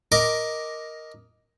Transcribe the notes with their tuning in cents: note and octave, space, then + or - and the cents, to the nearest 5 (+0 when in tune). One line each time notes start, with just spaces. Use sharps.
A#4 +0 D#5 +5 D6 +0